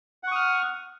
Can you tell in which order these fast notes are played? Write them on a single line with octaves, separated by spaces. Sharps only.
F#5 C#6 D#6 F6